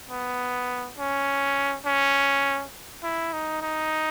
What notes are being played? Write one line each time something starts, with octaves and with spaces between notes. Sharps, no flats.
B3
C#4
C#4
E4
D#4
D#4